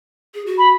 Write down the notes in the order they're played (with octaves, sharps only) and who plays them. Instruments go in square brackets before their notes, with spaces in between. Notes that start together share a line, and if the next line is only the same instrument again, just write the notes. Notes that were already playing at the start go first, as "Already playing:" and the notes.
[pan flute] G#4
F#4
[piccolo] B5